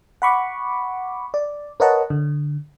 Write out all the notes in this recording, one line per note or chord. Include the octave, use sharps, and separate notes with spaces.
F#5 B5 C#6 D6
D5
A#4 B4 C#5 D#5 F#5 A5
D3